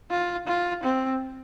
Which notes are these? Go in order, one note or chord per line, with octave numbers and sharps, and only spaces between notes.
F4
F4
C4